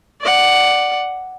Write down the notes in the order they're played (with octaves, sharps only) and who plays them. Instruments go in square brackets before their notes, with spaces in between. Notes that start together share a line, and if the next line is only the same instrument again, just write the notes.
[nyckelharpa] D5 F#5